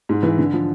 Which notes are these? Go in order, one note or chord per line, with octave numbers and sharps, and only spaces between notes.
G#2
E3
D3
F3